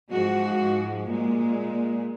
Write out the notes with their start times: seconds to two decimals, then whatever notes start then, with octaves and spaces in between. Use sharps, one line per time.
0.11 G#2 F3 G#3 F#4
1.06 A#2
1.11 G#3